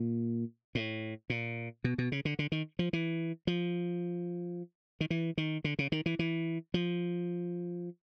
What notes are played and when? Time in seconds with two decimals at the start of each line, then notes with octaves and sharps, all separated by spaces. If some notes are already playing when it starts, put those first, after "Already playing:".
Already playing: A#2
0.75 A2
1.30 A#2
1.84 B2
1.98 B2
2.12 C#3
2.25 D3
2.39 D3
2.52 D#3
2.79 F3
2.93 E3
3.47 F3
5.01 D#3
5.10 E3
5.38 D#3
5.64 D3
5.79 C#3
5.92 D#3
6.06 E3
6.19 E3
6.74 F3